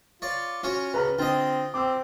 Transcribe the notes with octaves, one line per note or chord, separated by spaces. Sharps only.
F4 C#5 D5
C#4 F4 F#4 C#5
C#3 B4 A#5 F6
D3 C4 F4 D#5
C4 D6 E6